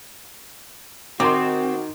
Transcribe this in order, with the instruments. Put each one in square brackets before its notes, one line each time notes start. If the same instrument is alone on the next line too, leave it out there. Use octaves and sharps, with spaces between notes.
[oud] D#3 [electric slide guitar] C4 [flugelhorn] F#4 [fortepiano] C6 D6